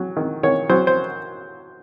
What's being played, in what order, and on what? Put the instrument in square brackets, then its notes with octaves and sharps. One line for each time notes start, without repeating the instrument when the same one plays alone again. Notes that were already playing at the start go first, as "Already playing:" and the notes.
Already playing: [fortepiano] F#3
D#3
D#3 C#5
F#3 C5
C5